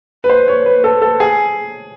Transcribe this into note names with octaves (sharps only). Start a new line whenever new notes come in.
B4
C5
C#5
B4
A4
A4
G#4